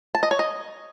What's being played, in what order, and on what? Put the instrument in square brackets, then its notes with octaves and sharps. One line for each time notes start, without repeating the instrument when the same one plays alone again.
[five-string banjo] A5
D#5
C#5
D#5